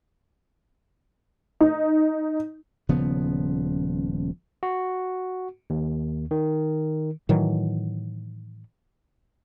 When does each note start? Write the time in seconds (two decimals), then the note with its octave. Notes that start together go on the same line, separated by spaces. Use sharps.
1.61 D#4
2.89 D#1 C#3 F3 B3
4.63 F#4
5.70 D#2
6.31 D#3
7.29 A2 D#3 E3 F#3